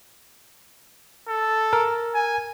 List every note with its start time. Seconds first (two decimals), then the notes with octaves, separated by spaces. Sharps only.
1.28 A4
1.73 A#4
2.14 G#5